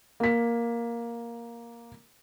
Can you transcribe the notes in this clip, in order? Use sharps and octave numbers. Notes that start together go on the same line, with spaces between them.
A#3 B6